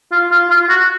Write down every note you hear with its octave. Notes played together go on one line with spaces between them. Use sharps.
F4
F4
F4
F#4